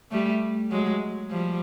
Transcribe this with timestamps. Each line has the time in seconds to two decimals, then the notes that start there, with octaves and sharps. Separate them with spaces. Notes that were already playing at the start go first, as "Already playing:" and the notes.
0.11 G3 A3
0.71 F#3 G#3
1.30 F3 G3